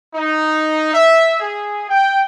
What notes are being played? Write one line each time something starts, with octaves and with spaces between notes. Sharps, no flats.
D#4
E5
G#4
G5